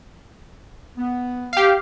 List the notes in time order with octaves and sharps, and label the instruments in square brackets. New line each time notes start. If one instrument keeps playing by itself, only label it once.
[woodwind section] B3
[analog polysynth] G4 F5